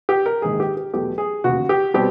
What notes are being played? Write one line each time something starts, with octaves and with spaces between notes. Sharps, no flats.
G4
A#4
A#1 G#2 D#3 G#4
G4
G4
E2 B2 F#3 A3 G4
G#4
E1 D#2 C#3 F#4
G4
B2 G3 C4 G4